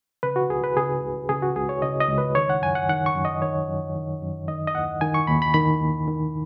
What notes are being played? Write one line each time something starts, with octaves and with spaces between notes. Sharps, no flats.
C#3 B4
F#4
C#2 G#4
B4
C#3 G#4
C#2
C#3 G#4
F#4
C#2 G#4
C#5
C#3 D#5
D#5
C#2
B4
D#3 C#5
F#5
F#2 G#5
F#5
D#3 F#5
C#6
F#2
D#5
D#3 C#5
F#2
D#3
F#2
D#3 D#5
D#5
D#2 F#5
D#3 G#5
C#6
D#2 B5
B5
D#3 B5
D#2
D#3